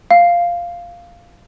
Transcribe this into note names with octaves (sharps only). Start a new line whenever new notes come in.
F5